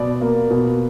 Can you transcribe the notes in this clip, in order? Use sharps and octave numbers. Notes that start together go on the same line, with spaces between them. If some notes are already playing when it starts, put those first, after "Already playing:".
Already playing: B2 D5
A#3
B2